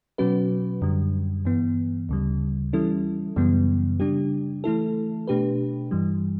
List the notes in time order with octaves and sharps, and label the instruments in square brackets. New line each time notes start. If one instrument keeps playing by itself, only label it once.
[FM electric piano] B2 F#3 C#4 F#4 B4
F#2 D3 G3
G2 E3 B3
D2 C#3 G3
E3 G3 C#4 E4 A4
F#2 C#3 E3 G3 B3
C#3 G3 D4 G4
E3 A3 E4 A4
B2 A3 D4 G4 B4
G2 E3 G3